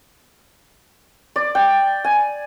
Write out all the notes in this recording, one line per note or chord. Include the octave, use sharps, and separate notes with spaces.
D5
G5
G#5